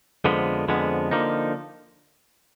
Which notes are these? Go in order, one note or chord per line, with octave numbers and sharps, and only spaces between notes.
F2 D3 F3 G#3 B3
F2 D3 F3 G#3 B3
D3 F3 A#3 D#4